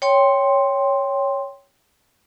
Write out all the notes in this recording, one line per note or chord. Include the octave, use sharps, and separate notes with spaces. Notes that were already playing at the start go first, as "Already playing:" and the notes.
C#5 G5 C6